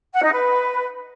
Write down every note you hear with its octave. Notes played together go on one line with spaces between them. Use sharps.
F#5
D#4
B4